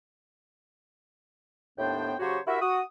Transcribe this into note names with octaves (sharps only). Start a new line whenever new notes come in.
D#2 A2 B3 D4 C5 G5
C#3 F#3 F#4 G4 C5 C#5
E4 F#4 G4 A#4 E5
F#4 D#6